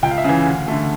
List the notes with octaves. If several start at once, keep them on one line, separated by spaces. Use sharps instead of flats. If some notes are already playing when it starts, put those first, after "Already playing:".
C#2 G5
F5
E5
C#3 E3 F5
D2
D3 A3